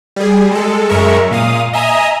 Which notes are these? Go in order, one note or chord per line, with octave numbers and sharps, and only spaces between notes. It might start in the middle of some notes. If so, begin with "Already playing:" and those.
G3 G#4
G#3 A4
F#2 G#3 A#4 E5 C#6
A#2 F5 D#6
D#5 E5 G#5 A#5 D#6